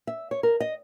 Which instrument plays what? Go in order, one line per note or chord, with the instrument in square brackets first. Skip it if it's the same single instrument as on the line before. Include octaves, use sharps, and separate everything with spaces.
[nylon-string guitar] E5
C#5
A#4
D#5